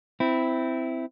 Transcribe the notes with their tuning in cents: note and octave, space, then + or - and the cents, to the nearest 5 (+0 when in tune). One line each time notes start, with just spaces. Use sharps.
C4 -15 E4 +0